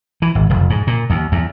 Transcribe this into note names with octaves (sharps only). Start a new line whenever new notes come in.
E3
G#1
F1
G#2
A#2
D#2
E2